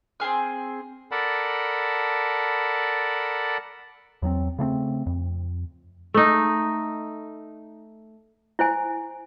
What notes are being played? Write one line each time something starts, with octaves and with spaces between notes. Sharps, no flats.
C4 F4 G#4 F6
A4 A#4 D5 F#5 A5 B5
E2 F#3 B3 C4
C#3 A3 B3 C4
F2
A3 D#4
E4 C5 G#5